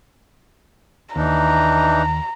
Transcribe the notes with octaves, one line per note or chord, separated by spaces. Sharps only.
D#2 E3 D4 D#4 A#5